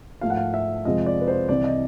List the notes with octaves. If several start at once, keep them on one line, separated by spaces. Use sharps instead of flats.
G#2 F3 A3 F5
F#5
F5
E5
F2 C3 F3 G#3 D#5
D5
B4
C5
C2 C3 E3 D5
D#5